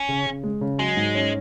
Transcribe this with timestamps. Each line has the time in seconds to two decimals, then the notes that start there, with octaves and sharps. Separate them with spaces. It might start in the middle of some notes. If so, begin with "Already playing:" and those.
Already playing: C#4
0.09 C#3
0.26 C#3
0.44 G#3
0.61 C#3
0.79 F#3 G#3
0.97 G#2
1.15 C#4